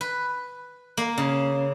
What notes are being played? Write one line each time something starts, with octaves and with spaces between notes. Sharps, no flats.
B4
A#3
C#3